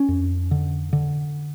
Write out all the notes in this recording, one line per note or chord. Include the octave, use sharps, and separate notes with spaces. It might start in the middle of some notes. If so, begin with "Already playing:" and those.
Already playing: C#4
F2
D3
D3